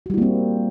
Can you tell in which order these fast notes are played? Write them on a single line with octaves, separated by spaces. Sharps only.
F#4 G3 E4 A#3 C4